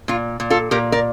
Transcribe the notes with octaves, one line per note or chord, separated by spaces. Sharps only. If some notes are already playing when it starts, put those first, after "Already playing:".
A#2 F4
A#2
F4 A4
A#2 G4 A#4
A#4 D5